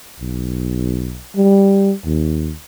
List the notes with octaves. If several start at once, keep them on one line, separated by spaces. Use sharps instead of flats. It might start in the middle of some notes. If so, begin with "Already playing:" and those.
B1
G3
D#2